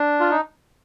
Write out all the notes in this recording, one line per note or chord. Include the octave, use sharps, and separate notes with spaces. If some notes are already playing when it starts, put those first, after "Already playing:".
Already playing: D4
F4
D#4